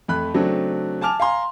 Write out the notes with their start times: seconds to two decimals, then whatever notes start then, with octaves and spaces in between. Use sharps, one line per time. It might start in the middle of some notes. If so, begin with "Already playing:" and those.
0.08 F2 A3 B5 F#6
0.34 C#3 F#3 A3 C4 D4
1.01 G#5 A5 D6 F6 F7
1.20 F5 G#5 A#5 C6